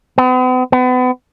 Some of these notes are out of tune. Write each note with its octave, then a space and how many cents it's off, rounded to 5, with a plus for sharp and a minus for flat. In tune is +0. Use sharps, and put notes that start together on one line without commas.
B3 +45
B3 +35